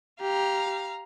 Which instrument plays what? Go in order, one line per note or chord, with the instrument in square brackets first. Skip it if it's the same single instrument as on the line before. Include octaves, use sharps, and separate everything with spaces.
[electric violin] G4 [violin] F5 A#5